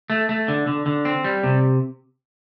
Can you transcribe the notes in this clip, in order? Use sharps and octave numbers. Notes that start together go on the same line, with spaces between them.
A3
A3
D3
D3
D3
C4
G3
C3